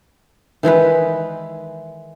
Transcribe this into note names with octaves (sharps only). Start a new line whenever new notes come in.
D#3 E3 G#3 B4